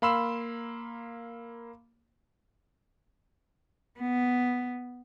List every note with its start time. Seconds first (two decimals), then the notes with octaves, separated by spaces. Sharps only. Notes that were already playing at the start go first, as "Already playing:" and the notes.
0.02 A#3 F5 B5 C6 E6 E7
3.99 B3